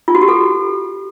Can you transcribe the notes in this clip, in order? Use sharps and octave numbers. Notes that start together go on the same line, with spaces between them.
F4
F#4
G4
A4